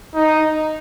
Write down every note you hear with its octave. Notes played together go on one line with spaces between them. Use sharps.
D#4